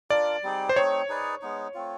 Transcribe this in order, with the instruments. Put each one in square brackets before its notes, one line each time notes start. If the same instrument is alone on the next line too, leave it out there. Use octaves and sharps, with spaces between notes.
[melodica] D4 F4 A#4 [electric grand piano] D5
[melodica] G3 C4 D#4 G#4
[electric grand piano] C5
[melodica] A3 C4 D#4 [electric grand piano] C#5
[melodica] D#4 G#4 B4 D5
G#3 B3 D#4
A3 C4 F4